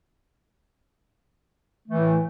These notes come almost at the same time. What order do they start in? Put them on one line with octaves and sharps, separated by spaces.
A3 E3 A2